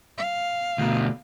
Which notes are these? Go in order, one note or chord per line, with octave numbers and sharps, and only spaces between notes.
F5
D2 B2